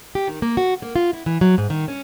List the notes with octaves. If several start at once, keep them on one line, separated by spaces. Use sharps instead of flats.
G4
D#3
A#3
F#4
A#3
F4
E4
E3
F#3
G#2
D#3
C#4